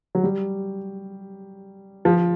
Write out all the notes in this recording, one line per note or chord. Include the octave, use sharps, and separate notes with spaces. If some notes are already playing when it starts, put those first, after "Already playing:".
F#3
G3
F3